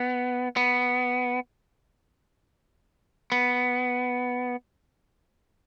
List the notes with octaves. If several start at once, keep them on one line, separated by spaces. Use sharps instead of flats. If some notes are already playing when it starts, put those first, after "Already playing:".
Already playing: B3
B3
B3